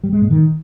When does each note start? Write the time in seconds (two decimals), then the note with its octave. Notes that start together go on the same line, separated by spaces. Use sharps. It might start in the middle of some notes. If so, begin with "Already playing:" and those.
0.04 G3
0.13 G#3
0.22 A#2
0.31 D#3